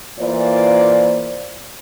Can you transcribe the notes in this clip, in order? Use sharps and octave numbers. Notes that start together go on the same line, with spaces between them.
E3 A#3 F4 C5 D5